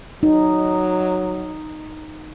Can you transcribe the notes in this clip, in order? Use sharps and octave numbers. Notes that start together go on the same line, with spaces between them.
F#3 D#4